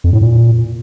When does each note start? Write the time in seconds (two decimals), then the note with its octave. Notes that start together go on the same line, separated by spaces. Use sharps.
0.04 F2
0.13 A2
0.21 A#2